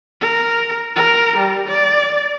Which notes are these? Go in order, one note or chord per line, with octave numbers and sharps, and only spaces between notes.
A#4
A#4
G3
D5